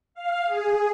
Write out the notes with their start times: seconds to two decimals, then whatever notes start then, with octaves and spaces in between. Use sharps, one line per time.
0.15 F5
0.46 G#4